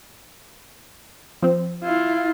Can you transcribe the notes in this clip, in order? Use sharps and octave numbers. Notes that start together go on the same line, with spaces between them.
F3 C4
E4 F4